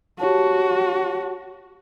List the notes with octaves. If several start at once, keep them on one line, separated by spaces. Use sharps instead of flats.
F#4 G4 C#5 A5